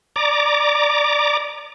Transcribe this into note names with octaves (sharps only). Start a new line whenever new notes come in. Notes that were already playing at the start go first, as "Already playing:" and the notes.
D5 A#5 D6